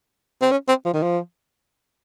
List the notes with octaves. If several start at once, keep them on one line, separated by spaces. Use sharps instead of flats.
C4
C#4
C4
F3
D#3
F3